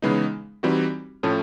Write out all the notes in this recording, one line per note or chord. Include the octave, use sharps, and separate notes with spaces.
C#3 E3 G#3 B3 D#4
E3 G3 C4 D#4 F#4
A2 F3 A3 C#4